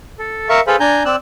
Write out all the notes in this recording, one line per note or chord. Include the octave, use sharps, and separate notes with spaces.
A4
A#4 E5 F5 C#6
G#4 A4 B4 C5 F5 B5
D4 G#5 A#5 G6
C4 D5 E6 F#6